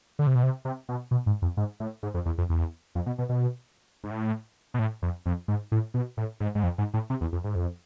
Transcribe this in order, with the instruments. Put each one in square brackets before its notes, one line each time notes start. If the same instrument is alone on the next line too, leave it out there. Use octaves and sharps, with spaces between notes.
[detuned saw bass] D3
C3
B2
C3
C3
B2
B2
G#2
F2
G#2
A2
G#2
F2
E2
F2
E2
F2
B2
B2
B2
G#2
A2
B2
A2
F2
F2
G#2
A2
B2
A2
G#2
G#2
F2
G#2
A2
C3
E2
F2
G#2
F2